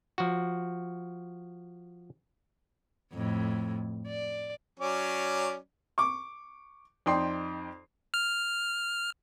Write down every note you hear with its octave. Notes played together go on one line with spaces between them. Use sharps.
F3 F#4
F2 A2
D5
F#3 C#4 D5
C#6 D6
F2 D#4 D5 G5 C6 C7
F6